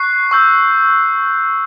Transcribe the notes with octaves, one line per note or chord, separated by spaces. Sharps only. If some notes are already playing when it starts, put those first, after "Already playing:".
Already playing: C#6 F#6 C7
C#6 E6 G6